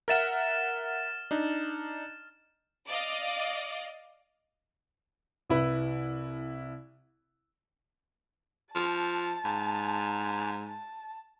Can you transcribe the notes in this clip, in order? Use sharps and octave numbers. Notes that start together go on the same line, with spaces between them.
A#4 E5 F#5 F6 A6 E7
D4 D#4
D5 D#5 F5
C2 E4 B4
F3 A5
G#2
A5